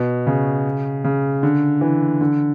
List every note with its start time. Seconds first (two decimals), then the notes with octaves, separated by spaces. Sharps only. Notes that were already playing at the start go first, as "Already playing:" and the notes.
Already playing: B2
0.27 C#3
1.04 C#3
1.43 D3
1.81 E3
2.21 D3